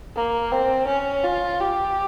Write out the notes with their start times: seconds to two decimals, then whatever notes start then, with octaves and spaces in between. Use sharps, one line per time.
0.16 A#3
0.52 C4
0.88 C#4
1.24 F4
1.60 G4